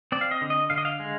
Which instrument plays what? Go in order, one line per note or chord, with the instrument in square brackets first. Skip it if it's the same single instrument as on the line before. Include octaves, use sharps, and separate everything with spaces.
[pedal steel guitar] C4 D5
F5
D#5
D3
D#5
D3 F5
D#5
F5
G#3